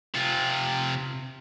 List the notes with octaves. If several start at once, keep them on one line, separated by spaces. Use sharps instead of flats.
C3 F4